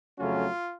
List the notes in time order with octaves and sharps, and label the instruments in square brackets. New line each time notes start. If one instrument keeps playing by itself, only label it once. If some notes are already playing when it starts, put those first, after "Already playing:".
[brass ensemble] F2 C#3 F#3 A3 C#4 F4